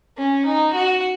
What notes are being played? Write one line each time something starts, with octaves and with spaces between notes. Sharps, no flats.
C#4
D#4
F#4